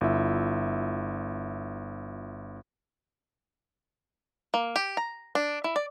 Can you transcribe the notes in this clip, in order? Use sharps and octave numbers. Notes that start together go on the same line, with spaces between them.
G1 E4 F4 E5
A#3
G4
A#5
D4
E4
D5